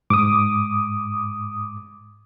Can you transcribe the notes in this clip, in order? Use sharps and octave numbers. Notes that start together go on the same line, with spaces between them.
G#2 D6 D#6